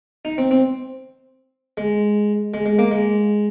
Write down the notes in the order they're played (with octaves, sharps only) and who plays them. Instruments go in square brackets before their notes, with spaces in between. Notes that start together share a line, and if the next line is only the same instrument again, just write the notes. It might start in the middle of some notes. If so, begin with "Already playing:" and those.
[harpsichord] D#4
C4
C4
G#3
G#3
G#3
A#3
G#3